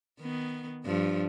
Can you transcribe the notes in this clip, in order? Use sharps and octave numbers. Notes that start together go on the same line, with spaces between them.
D#3 B3
G2 F3